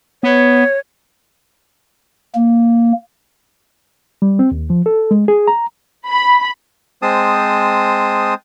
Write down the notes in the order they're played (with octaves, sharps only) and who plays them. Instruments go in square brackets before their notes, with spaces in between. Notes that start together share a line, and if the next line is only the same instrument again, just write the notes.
[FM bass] B3 [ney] C#5
[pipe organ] A#3
[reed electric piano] G3
C4
D#2
F3
A4
G#3
G#4
A#5
[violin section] B5
[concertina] G#3 C4 C5 A5 D#6